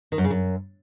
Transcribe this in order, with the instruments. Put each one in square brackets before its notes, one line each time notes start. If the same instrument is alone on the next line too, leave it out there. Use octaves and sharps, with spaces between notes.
[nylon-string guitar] D#3
F#2
C#3
F#2